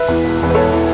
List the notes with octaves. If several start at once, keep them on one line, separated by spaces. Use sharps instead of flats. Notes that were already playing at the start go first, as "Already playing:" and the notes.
Already playing: B4 E5
E2 E3
E1
E2 E3
B4
E1 A4 C#5
E3